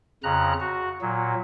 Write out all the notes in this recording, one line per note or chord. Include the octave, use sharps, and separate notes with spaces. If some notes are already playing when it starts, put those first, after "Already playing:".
F2 C#3 A#5 F#6
F#4
A#2 F#3